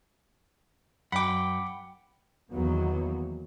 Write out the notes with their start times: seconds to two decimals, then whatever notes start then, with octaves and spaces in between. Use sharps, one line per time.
1.12 F#2 F#5 G5 B5 D6
2.51 E2 D#3 F#3 A#3 B3